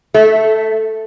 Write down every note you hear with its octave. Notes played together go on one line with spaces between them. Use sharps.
A3